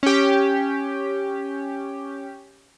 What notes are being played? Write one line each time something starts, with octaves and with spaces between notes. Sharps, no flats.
C#4 G4